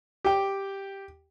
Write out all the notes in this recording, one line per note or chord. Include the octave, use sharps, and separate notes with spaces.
G4 G5